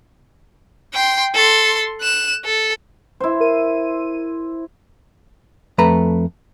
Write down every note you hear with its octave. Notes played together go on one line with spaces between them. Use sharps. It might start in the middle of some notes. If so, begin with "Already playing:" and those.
G5 C6
A4 C6
F#6 E7
A4
E4 C5
A#4 D#7
F2 A3 B4 A#5